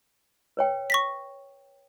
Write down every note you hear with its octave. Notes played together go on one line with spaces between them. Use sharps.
B4 C#5 G5
C#6 A#6 B6